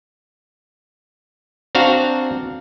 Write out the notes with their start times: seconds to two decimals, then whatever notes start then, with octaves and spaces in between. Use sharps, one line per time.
1.75 C4 D4 F#4 F5 A#5